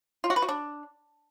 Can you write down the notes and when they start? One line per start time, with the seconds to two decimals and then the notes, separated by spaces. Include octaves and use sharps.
0.24 F4
0.30 F#4
0.36 B4
0.42 F#4
0.49 D4